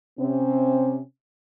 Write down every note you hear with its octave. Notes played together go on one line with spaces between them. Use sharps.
C3 C4 C#4